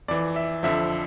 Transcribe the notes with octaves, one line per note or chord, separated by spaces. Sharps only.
F2 E3 D5
E5
F2 D3 F3 E5